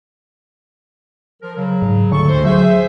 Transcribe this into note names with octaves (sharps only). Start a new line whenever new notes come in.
F3 A#4
C#3 F#3
G#2
D2 D3 A4 C#6
D2 G#3 C5
F#3 G#4 C5 E5